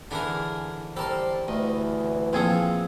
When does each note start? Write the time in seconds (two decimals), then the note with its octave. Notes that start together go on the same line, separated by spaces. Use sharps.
0.11 D3 E3 D4 G#4 A#4
0.97 G3 A4 A#4 C5 A5 C6
1.48 D2 E3 D#5
2.33 A#2 F3 C4 G#4 A4